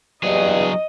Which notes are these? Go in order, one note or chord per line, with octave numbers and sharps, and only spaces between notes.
E2 G2 F#3 G#4 D#5